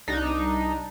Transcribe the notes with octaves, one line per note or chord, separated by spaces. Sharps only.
C2 D4 D#4